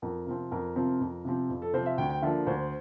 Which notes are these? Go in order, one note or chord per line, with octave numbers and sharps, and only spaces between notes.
F2 A#4
C3 F3 C4
F2 A#4
C3 F3 C4
F2
C3 F3 C4
F2
A4
C3 F3 C4 C5
E5
D2 G5
G5
D3 F3 A#3 E5
D2 C5